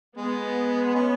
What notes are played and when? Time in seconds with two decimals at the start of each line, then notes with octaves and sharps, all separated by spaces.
0.17 G#3 B3
0.95 G#3 C#4